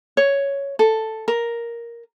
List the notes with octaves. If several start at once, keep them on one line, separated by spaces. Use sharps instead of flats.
C#5
A4
A#4